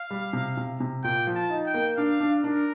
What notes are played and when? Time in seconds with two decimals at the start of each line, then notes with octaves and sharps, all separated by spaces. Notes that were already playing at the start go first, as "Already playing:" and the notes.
Already playing: F5
0.11 G3
0.33 C3
0.57 C3
0.80 C3
1.04 A#2 G5
1.27 F3
1.35 A5
1.50 D#4
1.66 G5
1.74 A#3
1.97 D4 F5
2.20 D4
2.43 D4 A#4